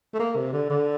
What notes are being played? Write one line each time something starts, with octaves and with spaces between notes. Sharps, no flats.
A3
A#3
C3
D3
D3